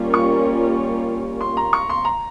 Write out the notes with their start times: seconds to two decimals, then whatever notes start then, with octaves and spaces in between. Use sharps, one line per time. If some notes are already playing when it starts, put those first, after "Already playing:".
Already playing: G3 A#3 C#4 F4 A#4
0.14 C#6
1.41 C6
1.57 A#5
1.73 C#6
1.90 C6
2.05 A#5